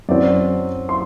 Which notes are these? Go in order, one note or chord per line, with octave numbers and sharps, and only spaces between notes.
F#2 F#3 C4 D5
C6